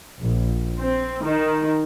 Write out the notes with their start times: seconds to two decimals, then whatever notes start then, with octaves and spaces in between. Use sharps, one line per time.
0.20 A#1
0.80 C4
1.24 D#3